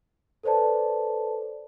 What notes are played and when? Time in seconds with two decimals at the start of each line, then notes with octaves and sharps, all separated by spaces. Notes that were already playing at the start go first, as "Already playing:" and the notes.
0.43 A4 B4 C5 D5 A5